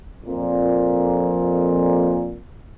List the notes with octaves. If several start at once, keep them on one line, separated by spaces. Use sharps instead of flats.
F2 A#2